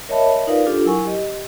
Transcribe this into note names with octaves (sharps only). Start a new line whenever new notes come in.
A#4 C#5 D#5 E5 A5 B5
D#4 F4 A#4 B4 D5 F5
D4 F4 G4 A4
F#3 E4 A#4 F#5 G#5 C#6
G4 D#5